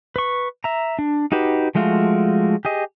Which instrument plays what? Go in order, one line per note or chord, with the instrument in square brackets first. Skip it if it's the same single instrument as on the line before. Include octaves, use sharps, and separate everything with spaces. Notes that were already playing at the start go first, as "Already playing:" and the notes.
[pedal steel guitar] B4 C#6
E5 A#5
D4
D#4 F#4 G4 B4
F3 G#3 A3 F4 F#4
G4 G#4 D#5